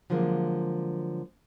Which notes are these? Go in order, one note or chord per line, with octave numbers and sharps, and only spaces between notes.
D3 F3 F#3 G#3 A#3